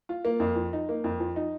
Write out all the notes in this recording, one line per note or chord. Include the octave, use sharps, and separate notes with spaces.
F4
A#3
F2
F3
D#4
A#3
F2
F3
D#4